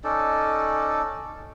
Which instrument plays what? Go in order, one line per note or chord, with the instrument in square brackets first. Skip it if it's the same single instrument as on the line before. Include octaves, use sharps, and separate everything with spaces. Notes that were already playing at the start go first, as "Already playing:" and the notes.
[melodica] C#4 D#4 A4 D5